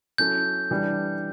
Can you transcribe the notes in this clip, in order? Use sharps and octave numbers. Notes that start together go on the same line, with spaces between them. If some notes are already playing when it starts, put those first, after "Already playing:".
F#3 C#4 E4 A4 G6
E3 G3 D4